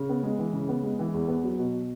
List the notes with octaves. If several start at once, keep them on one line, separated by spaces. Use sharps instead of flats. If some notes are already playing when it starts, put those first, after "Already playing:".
Already playing: C#3
B3
G#3
E3
C#3
B3
G#3
E3
E2
B3
F#3
B2